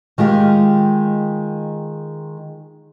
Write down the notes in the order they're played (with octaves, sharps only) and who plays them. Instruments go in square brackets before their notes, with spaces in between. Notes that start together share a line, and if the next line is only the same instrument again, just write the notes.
[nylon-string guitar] D#3 G#3 F4 G4